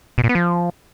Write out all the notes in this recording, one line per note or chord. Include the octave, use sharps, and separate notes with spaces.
B2
A#2
B3
F3